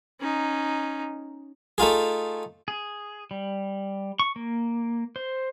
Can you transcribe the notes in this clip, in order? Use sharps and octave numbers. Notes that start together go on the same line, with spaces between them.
C#4 D#4
A3 D#4 F4 G#4
G#4
G3
C#6
A#3
C5